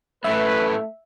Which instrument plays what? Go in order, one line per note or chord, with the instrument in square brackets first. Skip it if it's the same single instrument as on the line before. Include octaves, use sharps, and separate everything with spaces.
[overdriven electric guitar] F#2 A2 [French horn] A3 [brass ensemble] B4 [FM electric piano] E5